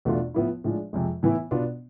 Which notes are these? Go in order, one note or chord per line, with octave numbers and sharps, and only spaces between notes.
E2 B2 A3 D4 F4
A2 F3 B3 E4
A2 F3 G#3 D4
F2 C3 G#3
A2 E3 B3 E4
B2 B3 D4 F4